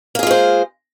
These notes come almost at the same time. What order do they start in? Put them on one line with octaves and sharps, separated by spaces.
A#3 G#4 F4 G#3 C5